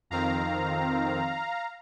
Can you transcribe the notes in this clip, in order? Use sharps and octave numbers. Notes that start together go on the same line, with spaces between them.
F2 D#3 C4 F5 A#5